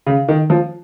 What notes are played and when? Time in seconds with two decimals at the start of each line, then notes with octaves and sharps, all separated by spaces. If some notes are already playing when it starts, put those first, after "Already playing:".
0.07 C#3
0.28 D#3
0.50 F3